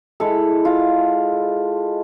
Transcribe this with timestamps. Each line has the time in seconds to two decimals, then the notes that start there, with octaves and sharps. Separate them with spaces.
0.20 G#3 E4 A4
0.65 F4